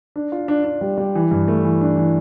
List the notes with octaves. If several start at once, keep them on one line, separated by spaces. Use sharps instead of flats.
D4
F4
D4
D4
G3
G3
E3
G2
A3
E3
D4
E3